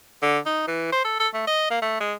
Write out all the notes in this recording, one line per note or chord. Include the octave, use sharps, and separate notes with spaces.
D3
D#4
E3
C5
A4
A4
A3
D#5
A#3
A3
G#3